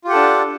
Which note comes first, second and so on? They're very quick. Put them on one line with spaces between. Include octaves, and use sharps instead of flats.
F4 G4 F#5 A4 D4